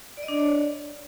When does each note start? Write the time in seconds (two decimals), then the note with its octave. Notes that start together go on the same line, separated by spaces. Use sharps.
0.17 D5
0.23 D#5
0.28 D4
0.34 D5
0.39 C#5